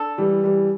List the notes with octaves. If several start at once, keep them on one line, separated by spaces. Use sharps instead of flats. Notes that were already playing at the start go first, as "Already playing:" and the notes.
Already playing: D4 A4
E3 G3
E3 G3